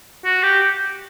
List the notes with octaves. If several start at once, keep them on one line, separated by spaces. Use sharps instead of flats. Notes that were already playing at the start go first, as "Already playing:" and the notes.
F#4
G4